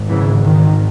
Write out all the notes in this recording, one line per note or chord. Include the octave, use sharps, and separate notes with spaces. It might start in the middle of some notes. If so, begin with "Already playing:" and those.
Already playing: G#1 G#2
C#3 E3
D#3